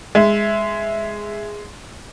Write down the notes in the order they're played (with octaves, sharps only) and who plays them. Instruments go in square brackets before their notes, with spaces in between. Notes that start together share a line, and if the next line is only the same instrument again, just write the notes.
[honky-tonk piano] G#3 [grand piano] E5